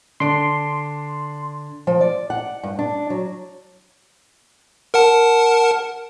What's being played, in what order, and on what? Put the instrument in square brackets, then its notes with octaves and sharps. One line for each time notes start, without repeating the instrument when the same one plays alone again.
[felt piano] D3 D4 D7 [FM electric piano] C6
[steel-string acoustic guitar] F3
D5
F#5
G2
D4
F#3
[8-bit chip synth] A#4 F#5 A5